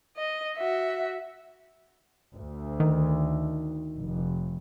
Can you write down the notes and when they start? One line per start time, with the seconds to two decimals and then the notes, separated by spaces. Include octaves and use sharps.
0.17 D#5
0.57 F#4 E5
2.33 D2
2.80 D#3
3.97 F1